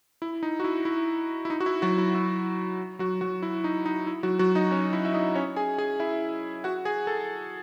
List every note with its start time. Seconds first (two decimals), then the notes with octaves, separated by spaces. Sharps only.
0.22 E4
0.43 D#4
0.60 F#4
0.64 E4
0.85 E4
1.45 E4
1.50 D#4
1.60 F#4
1.66 E4
1.82 F#3 F#4
1.98 E4
2.15 E4
2.99 F#3 F#4
3.21 F#3 F#4
3.43 E4
3.64 D#4
3.86 D#4
4.07 E4
4.23 F#3 F#4
4.39 F#3 F#4
4.55 D#4 D#5
4.71 C#4 C#5
4.93 E4 E5
5.05 E5
5.14 D#4 D#5
5.35 C#4 C#5
5.56 G#4 G#5
5.78 G#4 G#5
6.00 E4 E5
6.64 F#4 F#5
6.85 G#4 G#5
7.07 A4 A5